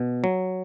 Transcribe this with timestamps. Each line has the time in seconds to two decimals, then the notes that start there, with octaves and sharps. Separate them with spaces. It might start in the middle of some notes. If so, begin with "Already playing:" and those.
Already playing: B2
0.24 F#3